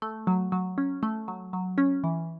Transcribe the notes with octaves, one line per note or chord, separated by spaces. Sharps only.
A3
F#3
F#3
C#4
A3
F#3
F#3
C#4
E3